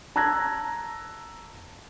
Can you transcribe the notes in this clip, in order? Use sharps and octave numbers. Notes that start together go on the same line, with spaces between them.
A5 A#5 E6 F#6 G#6 A#6